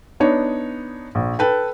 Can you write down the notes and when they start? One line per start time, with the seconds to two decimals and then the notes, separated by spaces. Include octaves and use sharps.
0.20 B3 D4 D#4 C#5
1.15 A#1
1.39 A4 B4 G5